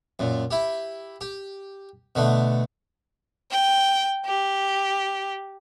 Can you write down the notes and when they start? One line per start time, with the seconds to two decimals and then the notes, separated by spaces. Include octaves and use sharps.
0.19 F#2 A#2
0.51 E4 G4
1.21 G4
2.15 B2 D3 A3
3.51 G5
4.25 G4